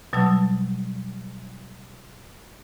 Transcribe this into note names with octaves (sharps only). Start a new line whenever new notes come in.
B2 F#3 G3 A5 E6